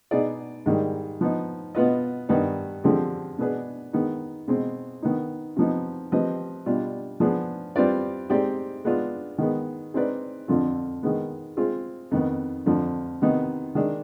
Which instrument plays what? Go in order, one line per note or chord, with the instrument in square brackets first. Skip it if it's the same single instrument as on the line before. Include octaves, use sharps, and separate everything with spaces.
[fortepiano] B2 B3 D#4 G#4 D5
G#2 D#3 G3
F3 B3 D#4
B2 B3 F4 B4 D#5
G2 D#3 B3 D#4 B4
D3 F3 G#3 C4 G4
B2 B3 D4 G#4 B4
D#3 G#3 B3 D#4
B2 G#3 C4
D#3 B3 D#4
C3 F3 B3 D#4
F3 C4 G4 B4 D#5
B2 G3 D4 F4
F3 B3 D4 G#4
G3 C4 F4 B4 D5
G#3 C4 D#4 G4 D5
G#3 B3 D4 F4
D#3 G#3 B3
G#3 C4 D#4 B4 D5
F2 D3 F3 C4 F4
D#3 G#3 B3
G#3 C4 F4 G#4
F2 D#3 B3
F2 D3 F3
C3 D#3 B3 D#4
D#3 G#3 D4